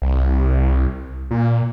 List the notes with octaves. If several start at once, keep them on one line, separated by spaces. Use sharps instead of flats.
C2
A#2